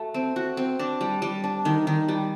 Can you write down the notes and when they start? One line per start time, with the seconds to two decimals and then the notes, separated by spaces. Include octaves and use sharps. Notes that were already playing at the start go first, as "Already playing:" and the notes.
Already playing: A3 F#4
0.14 C4
0.36 F#4
0.57 C4
0.79 D4
1.01 G3
1.22 G3
1.44 D4
1.65 D#3
1.87 D#3
2.08 G3